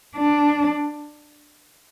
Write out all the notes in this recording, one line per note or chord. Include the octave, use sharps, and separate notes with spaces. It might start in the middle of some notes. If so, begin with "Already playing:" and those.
D4